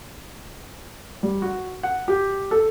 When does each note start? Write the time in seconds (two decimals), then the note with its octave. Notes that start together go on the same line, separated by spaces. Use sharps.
1.23 G3
1.42 F#4
1.83 F#5
2.08 G4
2.51 A4